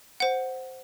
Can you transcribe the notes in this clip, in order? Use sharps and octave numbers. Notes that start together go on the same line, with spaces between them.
C5 F#5